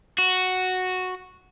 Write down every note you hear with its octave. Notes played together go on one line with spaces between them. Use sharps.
F#4